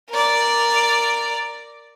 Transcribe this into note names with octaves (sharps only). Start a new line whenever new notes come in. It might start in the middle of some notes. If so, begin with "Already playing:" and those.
A#4 D5